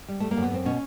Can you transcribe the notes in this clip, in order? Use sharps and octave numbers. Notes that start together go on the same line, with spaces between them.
G3
G3 A3
A#3
F#2
B3
F#2 C4
B2 C#4